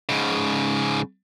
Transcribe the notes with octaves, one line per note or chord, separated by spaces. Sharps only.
G#2 C#3